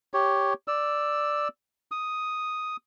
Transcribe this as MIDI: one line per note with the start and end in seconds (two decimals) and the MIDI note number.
0.14 0.53 67
0.14 0.53 73
0.68 1.48 74
0.68 1.48 88
1.91 2.76 87